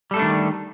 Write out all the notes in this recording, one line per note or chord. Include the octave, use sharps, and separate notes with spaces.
D#3 G3 A3 D4 A4